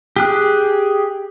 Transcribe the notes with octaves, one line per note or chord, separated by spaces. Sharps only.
G4 G#4 F#6